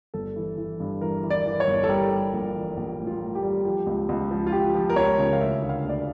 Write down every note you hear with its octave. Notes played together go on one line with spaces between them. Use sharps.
G1 A4
E3
E3
G2
E3 A#4
E3
D5
E3
C#5
G1
A4
G3 A#4
G3
A#1
E3
A#1
A2
F4
A2
G4
G3
F3 G4
C#2
C#2
F3
F4
F3 G4
F3
A#4
C#2 C#5
C#3
F5
D2 E5
D3
F5
D2 D5